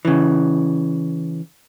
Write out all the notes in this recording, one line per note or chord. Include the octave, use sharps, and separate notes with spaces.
C#3 E3